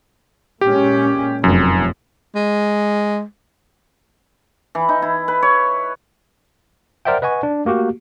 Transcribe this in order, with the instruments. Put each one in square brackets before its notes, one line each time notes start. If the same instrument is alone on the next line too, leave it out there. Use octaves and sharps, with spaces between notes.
[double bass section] A#2 G#3 C#4 [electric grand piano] G4
[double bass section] F1 [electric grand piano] F#2
[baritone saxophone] G#3
[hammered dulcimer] E3
D#4
E4
B4
C#5
[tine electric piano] A#4 C5 D5 E5 F#5 G5
B4 D#5 F#5 G#5 C#6
D4
A3 A#3 F#4 G4